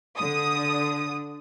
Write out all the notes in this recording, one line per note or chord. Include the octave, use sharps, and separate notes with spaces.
D3 D#6